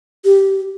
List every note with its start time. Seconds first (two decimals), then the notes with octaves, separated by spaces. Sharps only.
0.25 G4